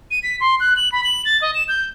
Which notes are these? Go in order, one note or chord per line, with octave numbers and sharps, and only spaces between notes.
D#7
B6
C6
F#6
F#7
B5
F#7
A6
D#5
E7
G6